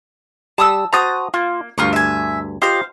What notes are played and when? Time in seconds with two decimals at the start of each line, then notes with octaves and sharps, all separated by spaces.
0.58 G3 A5 D#6 E6
0.93 F#4 C5 A5 A#5 D#6
1.34 A#3 F4
1.78 D2 G2 F4 A#4 C#6
1.93 E5 G#5
2.62 F4 G4 C5 D#5 F5